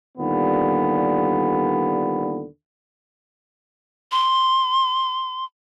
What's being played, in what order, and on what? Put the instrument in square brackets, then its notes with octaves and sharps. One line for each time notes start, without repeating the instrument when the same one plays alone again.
[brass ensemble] D#2 A#2 D3 G3 B3
[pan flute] C6